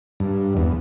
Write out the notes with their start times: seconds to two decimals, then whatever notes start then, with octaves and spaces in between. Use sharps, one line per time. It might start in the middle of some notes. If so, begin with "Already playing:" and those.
0.20 G2
0.57 E2